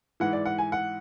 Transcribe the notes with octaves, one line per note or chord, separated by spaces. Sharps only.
G#2 E3 F#5
D5
F#5
G#5
F#5